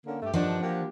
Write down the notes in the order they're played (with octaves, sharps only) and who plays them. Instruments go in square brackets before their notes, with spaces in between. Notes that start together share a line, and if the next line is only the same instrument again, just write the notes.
[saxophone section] D3 A#3 C#4
G2 A3 G4
[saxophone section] G2 D#3 D4 [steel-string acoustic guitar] F3 F#4
[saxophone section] A#3 D4 G4